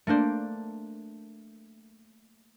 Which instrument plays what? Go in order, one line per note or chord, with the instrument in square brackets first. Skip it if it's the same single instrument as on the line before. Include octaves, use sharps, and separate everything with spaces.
[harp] A3 A#3 D4 C5